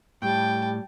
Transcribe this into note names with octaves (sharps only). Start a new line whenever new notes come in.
A2 G3 G5 A5